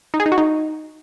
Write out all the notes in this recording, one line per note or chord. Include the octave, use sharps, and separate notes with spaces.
D#4
G#4
D#4
F#4
D#4